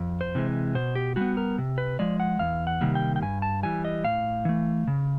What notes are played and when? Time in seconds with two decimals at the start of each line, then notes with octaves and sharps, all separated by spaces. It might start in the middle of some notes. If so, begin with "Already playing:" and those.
Already playing: F2
0.21 C5
0.35 C3 E3 G#3
0.75 B2 C5
0.95 G4
1.16 G3 B3 F#4
1.37 A#4
1.58 C3
1.78 B4
1.99 F3 G#3 D5
2.20 F#5
2.39 E2 F5
2.67 F#5
2.81 C3 D#3 G3 A#3
2.95 G5
3.16 G5
3.22 G2 G#5
3.42 A5
3.63 E3 G3 G#5
3.85 D#5
4.04 A2 F5
4.45 E3 A3
4.87 C#3